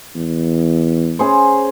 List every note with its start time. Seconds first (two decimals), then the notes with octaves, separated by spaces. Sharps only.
0.15 E2
1.19 C#4 G#4 C5